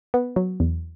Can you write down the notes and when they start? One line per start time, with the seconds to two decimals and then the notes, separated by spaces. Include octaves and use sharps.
0.14 B3
0.36 F#3
0.60 E2